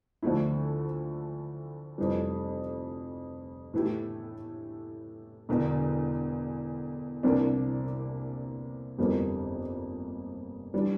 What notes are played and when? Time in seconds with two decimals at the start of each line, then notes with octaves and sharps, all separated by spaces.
0.23 D2 D3 F3 A3 E4
1.98 F1 F2 E3 G3
3.73 A2 E3 A3 E4 G4
5.49 E1 E2 D3
7.23 C2 C3 E3 A#3 D4
8.98 G1 F2 E3 G3 A#3
10.74 E3 G3 D4